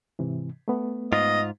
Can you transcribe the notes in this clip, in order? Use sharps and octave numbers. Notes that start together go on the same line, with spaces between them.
G#2 C3 E3
A3 B3
G#2 F4 D#5